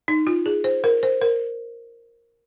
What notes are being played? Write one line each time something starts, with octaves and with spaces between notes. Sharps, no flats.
D#4
F4
G#4
C5
A#4
C5
A#4